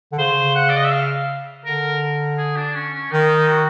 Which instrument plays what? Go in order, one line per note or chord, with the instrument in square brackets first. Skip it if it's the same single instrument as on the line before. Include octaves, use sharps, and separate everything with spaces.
[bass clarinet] D3
[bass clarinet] C#3 [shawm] C5
[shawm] F#5
D5
D#5
E5
F5
[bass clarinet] D3 [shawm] A#4
[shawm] G#4
D4
C#4
C#4
[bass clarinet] D#3 [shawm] D#4
[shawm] F#4